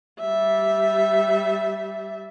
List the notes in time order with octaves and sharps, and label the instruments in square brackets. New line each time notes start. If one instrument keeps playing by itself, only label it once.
[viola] G3 E5